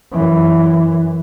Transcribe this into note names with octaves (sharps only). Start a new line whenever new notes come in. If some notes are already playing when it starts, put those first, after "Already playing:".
F#2 E3